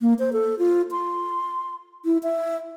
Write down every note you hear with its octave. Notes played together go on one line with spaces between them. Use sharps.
A#3
C5
A4
F4
C6
E4
E5